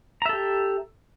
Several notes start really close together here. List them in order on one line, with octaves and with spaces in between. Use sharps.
A#5 E5 A4 G4